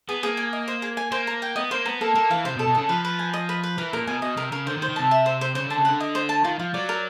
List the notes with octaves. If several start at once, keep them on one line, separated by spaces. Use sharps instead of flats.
B3 G#4
A#3 G#4
G#5
D#5
C5
G#4
G#5
A#3 C5
A#5
G5
B3 D#5
A#3 C5
B3 A#5
A#3 A4
A#3 A4
E3 F5
C3 C5
B2
A4
B2
C#3 A4
F3 B4
B4
G#5
D#5
B4
B4
E3 A#4
A#2 A#4
B2 G#5
B2 D#5
C3 A#4
C#3 A#4
D3 C5
D#3
C5
D#3
C3 A5
E5
C5
C5
C#3 C5
D3 A5
C#3
D3 F#5
D#5
C5
A5
D#3 F4
F3 F4
F#3 D5
A#4